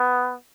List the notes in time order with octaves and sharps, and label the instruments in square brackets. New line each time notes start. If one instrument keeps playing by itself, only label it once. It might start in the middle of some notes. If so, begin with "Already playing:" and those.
Already playing: [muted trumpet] B3